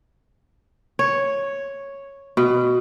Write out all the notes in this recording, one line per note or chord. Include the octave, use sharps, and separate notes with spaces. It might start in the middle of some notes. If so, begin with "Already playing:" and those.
C#5
B2